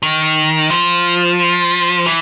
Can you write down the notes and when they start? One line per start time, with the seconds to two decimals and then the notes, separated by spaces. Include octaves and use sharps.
0.03 D#3
0.70 F3
2.06 E3